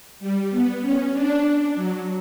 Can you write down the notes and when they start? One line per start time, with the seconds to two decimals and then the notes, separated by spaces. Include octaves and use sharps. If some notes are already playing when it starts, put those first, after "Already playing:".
0.20 G3
0.50 B3
0.81 C#4
1.12 D4
1.75 F#3